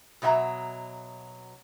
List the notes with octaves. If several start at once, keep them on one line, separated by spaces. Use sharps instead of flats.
B2 F#3 E5 F#5 A#5